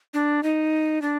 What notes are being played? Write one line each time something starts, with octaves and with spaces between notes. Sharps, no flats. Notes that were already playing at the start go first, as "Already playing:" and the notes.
D4
D#4
D4